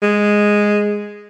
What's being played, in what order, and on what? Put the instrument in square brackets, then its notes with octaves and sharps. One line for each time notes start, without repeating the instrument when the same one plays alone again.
[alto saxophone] G#3